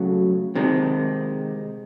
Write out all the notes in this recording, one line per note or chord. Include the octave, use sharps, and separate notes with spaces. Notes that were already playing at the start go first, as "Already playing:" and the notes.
Already playing: C#3 F#3 A3
C3 D#3 G#3